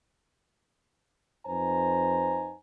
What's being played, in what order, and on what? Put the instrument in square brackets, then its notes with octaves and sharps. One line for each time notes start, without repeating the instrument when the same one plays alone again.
[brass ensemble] F2 D#4 B4 C5 G#5 A#5